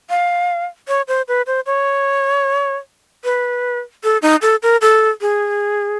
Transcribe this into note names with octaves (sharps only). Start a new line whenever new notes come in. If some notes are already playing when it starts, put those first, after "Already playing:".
F5
C#5
C5
B4
C5
C#5
B4
A4
D#4
A4
A#4
A4
G#4